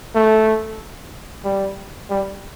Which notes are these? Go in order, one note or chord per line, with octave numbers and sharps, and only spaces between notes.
A3
G3
G3